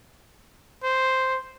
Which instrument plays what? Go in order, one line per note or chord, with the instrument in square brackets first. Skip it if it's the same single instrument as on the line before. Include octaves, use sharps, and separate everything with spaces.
[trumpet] C5